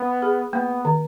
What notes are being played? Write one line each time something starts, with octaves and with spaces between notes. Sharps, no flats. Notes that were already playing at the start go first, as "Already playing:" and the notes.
Already playing: B3
G#4
A#3 B3
D#3